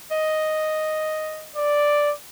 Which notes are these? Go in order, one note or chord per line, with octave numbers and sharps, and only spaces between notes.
D#5
D5